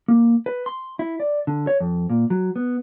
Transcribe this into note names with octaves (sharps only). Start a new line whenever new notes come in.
A#3
B4
C6
E4
D5
D3
C#5
F2
A#2
F#3
B3